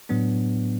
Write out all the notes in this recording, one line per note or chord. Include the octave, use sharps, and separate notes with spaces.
A2 F#3 B3 D4